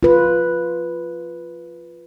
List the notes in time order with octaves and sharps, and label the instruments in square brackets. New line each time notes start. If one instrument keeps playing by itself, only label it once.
[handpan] F4 B4